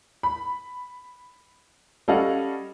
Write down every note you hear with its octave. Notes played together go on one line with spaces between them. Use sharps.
B5
G3 C#4 A4 D#5 F5 F#5